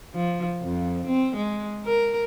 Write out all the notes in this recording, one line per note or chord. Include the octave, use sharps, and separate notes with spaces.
F3
F2
C4
G#3
A#4